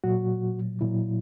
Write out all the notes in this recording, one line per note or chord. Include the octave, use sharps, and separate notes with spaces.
A#2 F#3 F#4
A#2 F#3 E4